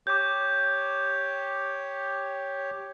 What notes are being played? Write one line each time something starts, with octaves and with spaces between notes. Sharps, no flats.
G4 C#5 D6 G6